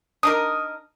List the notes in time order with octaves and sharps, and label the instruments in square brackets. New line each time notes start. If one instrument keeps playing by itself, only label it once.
[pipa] D4 D#4 A#4 [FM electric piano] D#6